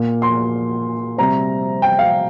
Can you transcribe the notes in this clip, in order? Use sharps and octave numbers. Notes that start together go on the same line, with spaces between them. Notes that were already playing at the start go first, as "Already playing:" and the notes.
Already playing: A#2 A#3
C6
C3 G3 C4 A#5
G5
F5